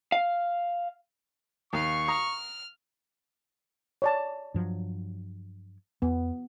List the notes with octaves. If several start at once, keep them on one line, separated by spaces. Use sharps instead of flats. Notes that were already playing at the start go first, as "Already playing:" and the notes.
F5
D#2 F5 C#6 F6
A#5 D#6 F6
C#5 D5 A5
G2 F3 F#3
E2 B3